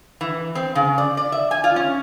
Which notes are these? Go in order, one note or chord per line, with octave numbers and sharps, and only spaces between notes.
E3
C4
C#3
D5
D5
E5
G#5
F4
C#4